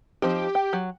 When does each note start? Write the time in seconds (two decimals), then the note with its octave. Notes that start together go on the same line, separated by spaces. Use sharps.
0.22 F3 C4 D#4 G4
0.55 G5
0.73 F#3